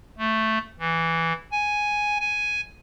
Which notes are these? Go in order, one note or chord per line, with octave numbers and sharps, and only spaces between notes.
A3
E3
G#5
G#5